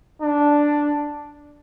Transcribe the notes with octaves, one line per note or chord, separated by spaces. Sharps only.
D4